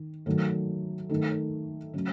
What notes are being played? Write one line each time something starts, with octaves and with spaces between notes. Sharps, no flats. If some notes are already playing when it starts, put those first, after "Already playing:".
Already playing: D#3
D#3 F#3 A3
D#3 A3
C#3 F#3 A3